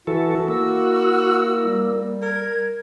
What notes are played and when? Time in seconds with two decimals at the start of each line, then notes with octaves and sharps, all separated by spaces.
0.07 E3 E4 F#4 A4 E5
0.48 A#3 E6
1.65 G3
2.22 A#4 G#6